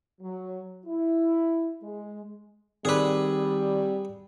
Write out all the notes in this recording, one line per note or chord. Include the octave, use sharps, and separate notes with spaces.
F#3
E4
G#3
D#3 G3 C4 G#4 B4 D5 D6 E6